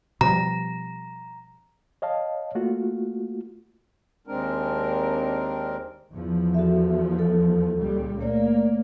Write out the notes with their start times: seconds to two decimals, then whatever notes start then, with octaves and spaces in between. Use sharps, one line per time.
0.21 B2 F3 G3 A#5
2.02 C#5 D#5 F5 A5
2.55 A3 A#3 F4 F#4
4.27 D#2 G#3 C4 D4 A#4
6.13 E2 F3
6.54 F#4 A4 E5
7.19 A4
7.78 C#2 A#2 G3
8.21 A3 A#3 C#5 D5